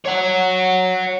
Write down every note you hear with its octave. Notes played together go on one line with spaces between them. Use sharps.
C#5 F#5